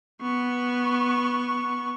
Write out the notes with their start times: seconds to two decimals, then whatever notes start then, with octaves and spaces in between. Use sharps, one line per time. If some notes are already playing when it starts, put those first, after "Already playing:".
0.21 B3 C#6